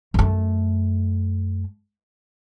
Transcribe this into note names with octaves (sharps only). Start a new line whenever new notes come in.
F#2 A3